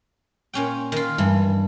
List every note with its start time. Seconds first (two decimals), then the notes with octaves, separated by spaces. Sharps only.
0.54 A#2 C#4 G5
0.92 D#3 F4
1.18 G2 E3